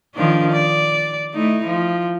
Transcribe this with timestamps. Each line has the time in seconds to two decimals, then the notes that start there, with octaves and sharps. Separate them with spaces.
0.15 D#3 F3 D4
0.52 D5
1.34 A3 D#4 E4
1.66 F3